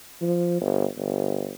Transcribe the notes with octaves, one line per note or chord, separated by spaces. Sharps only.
F3
G1
G1